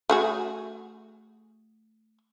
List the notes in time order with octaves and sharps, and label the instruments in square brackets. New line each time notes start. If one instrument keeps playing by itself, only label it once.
[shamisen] A3 F#4 G#4